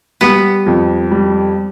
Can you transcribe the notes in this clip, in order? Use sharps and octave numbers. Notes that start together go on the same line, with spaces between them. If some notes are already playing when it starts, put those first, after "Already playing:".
G3 B3
F2
G3